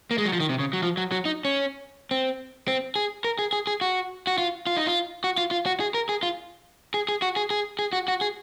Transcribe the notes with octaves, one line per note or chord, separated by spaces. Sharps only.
A#3
G#3
F#3
F3
D#3
C3
C#3
F#3
F3
F#3
F#3
D#4
C#4
C4
C4
G#4
A#4
G#4
G#4
G#4
F#4
F#4
F4
F4
D#4
F4
F#4
F4
F4
F#4
G#4
A#4
G#4
F4
G#4
G#4
F#4
G#4
G#4
G#4
F#4
F#4
G#4